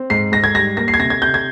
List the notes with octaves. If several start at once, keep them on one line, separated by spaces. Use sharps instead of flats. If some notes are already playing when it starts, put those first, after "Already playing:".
Already playing: C4
G#2 C7
G#2 A#6
G#6
G3 A#6
A#3 A#6
C7
G#6
C3 A#6
G#6
C3 G6
G#6